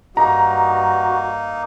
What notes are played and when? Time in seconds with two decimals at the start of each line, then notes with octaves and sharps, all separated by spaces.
0.17 G2 A#3 D#4 F#4 A#5